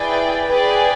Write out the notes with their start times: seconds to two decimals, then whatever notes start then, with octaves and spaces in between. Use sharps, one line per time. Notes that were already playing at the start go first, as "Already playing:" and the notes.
Already playing: E4 G#4 B4 D5 G5
0.47 G#4 B4 D5 G5